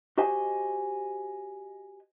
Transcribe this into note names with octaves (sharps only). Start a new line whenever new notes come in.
F#4 G4 C5 D#5 G#5